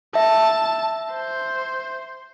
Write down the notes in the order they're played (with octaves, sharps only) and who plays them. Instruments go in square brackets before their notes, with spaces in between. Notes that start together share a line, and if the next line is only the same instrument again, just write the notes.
[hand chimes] E5 [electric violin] A5
[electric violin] C5